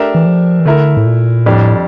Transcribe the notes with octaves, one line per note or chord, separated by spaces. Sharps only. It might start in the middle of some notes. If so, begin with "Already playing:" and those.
Already playing: A3 D4 G4 A#4 E5
E3
F3
E3
D3 A3 E4 A#4
A2
A#2
F2 A2 D3 G3 D4